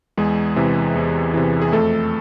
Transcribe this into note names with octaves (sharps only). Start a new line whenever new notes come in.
E2 G#3 G#4
C3 E3
E2
C3 E3
G#4
F2 A3 A4